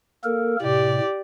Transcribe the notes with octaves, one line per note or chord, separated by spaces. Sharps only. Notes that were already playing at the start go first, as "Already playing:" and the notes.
A#3 A4 A#4
A2 C3 G4 D5